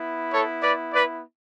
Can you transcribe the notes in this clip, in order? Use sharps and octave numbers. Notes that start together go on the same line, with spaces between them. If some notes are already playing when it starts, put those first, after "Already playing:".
Already playing: B3 E4
A4 C#5
B4 D5
B4 D5